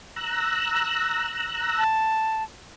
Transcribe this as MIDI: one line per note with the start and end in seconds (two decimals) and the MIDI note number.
0.16 1.84 82
0.16 1.84 88
0.16 1.84 90
1.78 2.44 81